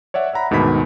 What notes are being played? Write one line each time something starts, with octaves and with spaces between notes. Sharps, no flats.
C#5 D5 E5 F#5
E5 F#5 A#5 B5
D2 G#2 B2 D#3 B5 B6